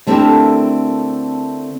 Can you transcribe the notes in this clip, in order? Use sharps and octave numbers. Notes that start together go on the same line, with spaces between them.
D3 A3 C4 E4 G4 A#4